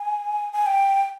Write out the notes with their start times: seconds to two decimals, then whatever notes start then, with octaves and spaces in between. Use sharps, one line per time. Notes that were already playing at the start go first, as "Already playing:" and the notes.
Already playing: G#5
0.53 G#5
0.66 G5